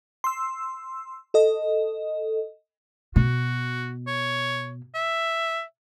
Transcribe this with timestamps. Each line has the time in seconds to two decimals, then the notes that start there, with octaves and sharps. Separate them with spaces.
0.24 C6 E6
1.34 A4 D#5
3.16 B2 F#4
4.07 C#5
4.94 E5